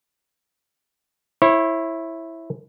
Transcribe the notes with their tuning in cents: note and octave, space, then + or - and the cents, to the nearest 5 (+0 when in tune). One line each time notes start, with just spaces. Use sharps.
E4 +0 C#5 -40